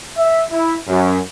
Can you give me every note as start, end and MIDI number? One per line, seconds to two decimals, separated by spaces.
0.17 0.43 76
0.51 0.76 64
0.88 1.18 42